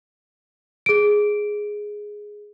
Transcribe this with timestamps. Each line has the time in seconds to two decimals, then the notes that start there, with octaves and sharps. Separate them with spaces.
0.86 G#4 D7